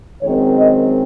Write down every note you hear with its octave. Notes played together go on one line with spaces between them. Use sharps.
F#2 D#3 G#3 C4 C#5
D#5